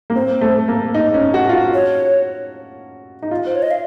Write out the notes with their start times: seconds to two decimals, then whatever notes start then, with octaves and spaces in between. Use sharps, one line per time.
0.10 A#3
0.15 C4 C5
0.41 A3
0.68 A#3
0.94 D#4
1.14 C#4
1.34 F#4
1.49 F4
1.54 F#4
1.74 C#5
3.22 D#4
3.31 F4
3.46 C5
3.55 C#5
3.62 D#5
3.71 F5